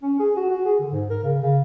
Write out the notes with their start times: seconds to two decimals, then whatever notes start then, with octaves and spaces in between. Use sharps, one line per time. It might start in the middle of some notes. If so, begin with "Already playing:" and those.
0.02 C#4
0.19 G#4
0.36 F#4
0.50 F#4
0.65 G#4
0.79 D3
0.92 G#2
1.10 A#4
1.23 C#3
1.42 C#3